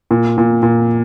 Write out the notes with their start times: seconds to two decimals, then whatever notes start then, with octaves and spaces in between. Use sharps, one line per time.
0.11 A#2
0.38 A#2
0.63 A#2